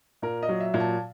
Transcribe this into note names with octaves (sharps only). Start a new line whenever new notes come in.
A#2 A#4
D#5
F#3
E5
A#2
A5